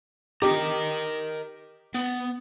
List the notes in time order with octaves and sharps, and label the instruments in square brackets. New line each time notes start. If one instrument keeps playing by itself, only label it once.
[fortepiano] G4 [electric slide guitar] A#4 D#5 A#5
[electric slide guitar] B3